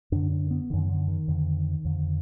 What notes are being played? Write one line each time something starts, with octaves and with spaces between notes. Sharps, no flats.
F#2 D3 D4
D4
B3
F#2 D3 D#3
D3
D#3
F2 D3
F2 D3